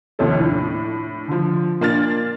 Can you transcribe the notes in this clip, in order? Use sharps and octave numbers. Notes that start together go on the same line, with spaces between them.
D#2 C3 F3 C#4 A4
A2 D4
D3 F3
A#2 A#3 D4 F6 A6